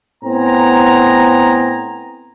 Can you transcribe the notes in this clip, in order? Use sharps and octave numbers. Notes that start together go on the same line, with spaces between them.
A2 B3 C4 G#5 A#5